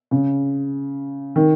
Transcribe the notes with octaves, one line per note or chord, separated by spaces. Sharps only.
C#3
D#3